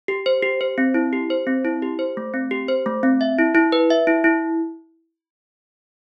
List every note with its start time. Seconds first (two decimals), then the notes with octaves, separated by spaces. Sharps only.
0.08 G4
0.26 C5
0.42 G4
0.61 C5
0.78 C4
0.94 E4
1.13 G4
1.30 C5
1.47 C4
1.65 E4
1.82 G4
1.99 C5
2.17 A3
2.34 C4
2.51 G4
2.68 C5
2.86 A3
3.03 C4
3.21 E5
3.39 E4
3.55 E4
3.72 B4
3.90 E5
4.07 E4
4.24 E4